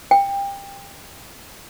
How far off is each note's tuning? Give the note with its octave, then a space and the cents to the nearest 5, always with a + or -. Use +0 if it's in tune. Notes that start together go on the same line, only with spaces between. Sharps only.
G5 +25